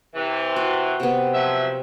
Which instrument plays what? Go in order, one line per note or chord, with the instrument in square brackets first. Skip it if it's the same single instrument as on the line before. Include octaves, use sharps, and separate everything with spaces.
[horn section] C3 E3
[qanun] F#4
C3 B3
[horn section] F3 F#3 E5